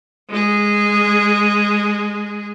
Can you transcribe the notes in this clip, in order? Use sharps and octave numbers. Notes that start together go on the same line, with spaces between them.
G#3 G#4